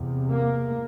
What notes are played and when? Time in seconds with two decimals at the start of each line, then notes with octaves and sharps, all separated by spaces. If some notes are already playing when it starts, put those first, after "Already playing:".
Already playing: E2 C3
0.28 A#3